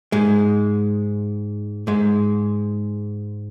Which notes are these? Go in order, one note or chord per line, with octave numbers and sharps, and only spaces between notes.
G#2 G#3
G#2 G#3